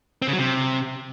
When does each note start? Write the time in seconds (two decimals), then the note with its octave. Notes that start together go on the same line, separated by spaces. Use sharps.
0.22 C4
0.28 C#3
0.33 F#3
0.39 C3